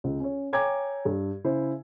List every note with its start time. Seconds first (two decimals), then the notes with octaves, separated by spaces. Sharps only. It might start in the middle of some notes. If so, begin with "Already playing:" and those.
0.04 C#2
0.20 C#4 C#5
0.53 C#5 G5 G#5 A#5 D6 G#6
1.05 G2
1.44 C#3 E4 C5